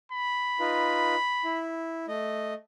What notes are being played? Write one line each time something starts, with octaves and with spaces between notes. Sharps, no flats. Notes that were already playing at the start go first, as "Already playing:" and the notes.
B5
D#4 F4 B4
E4
A3 D#5